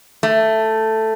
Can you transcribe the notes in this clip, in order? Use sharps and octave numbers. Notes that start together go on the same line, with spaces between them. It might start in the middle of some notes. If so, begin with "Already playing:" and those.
A3